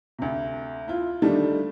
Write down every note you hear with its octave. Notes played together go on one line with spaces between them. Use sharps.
D2 C3
E4 F4
D3 D#3 G3 A3 D4 D#4